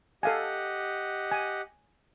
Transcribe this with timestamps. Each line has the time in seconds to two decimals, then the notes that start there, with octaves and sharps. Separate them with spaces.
0.23 G4 A4 D#5 F5 F#5 G#5
1.31 G#5